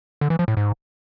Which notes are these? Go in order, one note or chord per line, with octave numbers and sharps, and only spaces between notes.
D3
E3
F3
A2
G#2